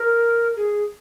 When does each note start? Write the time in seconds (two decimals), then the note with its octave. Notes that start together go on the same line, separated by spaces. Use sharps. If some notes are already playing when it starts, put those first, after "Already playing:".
Already playing: A#4
0.56 G#4